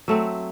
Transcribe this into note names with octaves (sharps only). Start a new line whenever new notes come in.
F#3 A3 C4